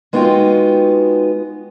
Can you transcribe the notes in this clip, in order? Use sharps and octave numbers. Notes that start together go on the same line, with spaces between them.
G#3 B3 D#4 F4 F#4 G5